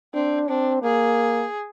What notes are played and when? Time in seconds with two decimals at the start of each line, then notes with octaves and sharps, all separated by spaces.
0.14 C4 D4
0.48 C4 D4
0.83 A#3 G#4